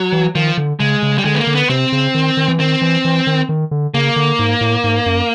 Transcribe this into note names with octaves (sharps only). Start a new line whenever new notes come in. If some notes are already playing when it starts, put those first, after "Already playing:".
Already playing: F#3
E3
D#3 F3
D3
C#3 G#3
C#3
G3
D3 G#3
B3
A#3
D3
B3
C3 C4
C#3
D#3
D#3
E3
D#3 C4
E3
E3
D#3
D#3
D3
C#3 A#3
D3
G#2
A2
G#2
F#2